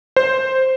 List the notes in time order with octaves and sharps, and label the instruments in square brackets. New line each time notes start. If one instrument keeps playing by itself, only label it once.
[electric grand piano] C5